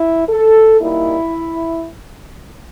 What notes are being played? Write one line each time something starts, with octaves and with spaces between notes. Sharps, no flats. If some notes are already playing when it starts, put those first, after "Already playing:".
Already playing: E4
A4
A#2 G3 A#3 D#4 E4